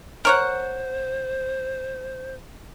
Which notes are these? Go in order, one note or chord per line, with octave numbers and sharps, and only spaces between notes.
A#4 C5 C#5 F#5